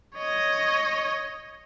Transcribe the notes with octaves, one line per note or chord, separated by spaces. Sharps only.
C#5 D#5